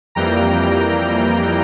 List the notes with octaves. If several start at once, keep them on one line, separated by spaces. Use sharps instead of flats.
F2 E3 G3 A#3 G5 A#5